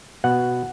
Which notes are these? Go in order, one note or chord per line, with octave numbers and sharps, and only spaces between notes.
B2 F#5